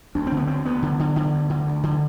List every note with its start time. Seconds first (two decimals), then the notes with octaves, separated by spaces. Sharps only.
0.15 D2 D4
0.27 C4
0.32 D3
0.37 B3
0.47 D2 C4
0.66 D2 B3
0.83 D3
0.99 D3
1.16 D3
1.33 D2
1.50 D3
1.67 D2
1.83 D3